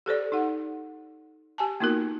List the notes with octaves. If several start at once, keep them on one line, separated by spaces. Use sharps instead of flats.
G4 A4 C5 D5
D#4 G4 F#5
G4 G#5 A5
A#3 B3 D#4 F4 F#4 A#4